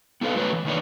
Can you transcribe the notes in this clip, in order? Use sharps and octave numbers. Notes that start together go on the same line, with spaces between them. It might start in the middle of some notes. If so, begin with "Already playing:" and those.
B3 E4 A4 B4 F5
F#3 A3 B4 C#5
E3
D#3 E3 A#3 D4 B4 C#5